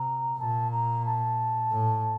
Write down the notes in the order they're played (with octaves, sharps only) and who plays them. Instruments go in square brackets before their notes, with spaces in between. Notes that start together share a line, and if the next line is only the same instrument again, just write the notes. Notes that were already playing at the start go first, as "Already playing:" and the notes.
Already playing: [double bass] C3 [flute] A#5
[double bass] A#2 [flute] A5
[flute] A#5
A5
[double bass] A2